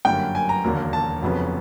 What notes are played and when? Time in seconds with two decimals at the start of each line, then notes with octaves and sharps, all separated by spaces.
0.05 G1 F#2 D3 G3 A#3 G5
0.35 G#5
0.49 A#5
0.64 E1 D#2 D3 F#3 A#3
0.93 A5
1.22 F1 F2 C#3 F#3 B3